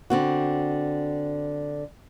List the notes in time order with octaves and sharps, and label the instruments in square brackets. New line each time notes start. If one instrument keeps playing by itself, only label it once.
[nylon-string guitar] D3 C4 F#4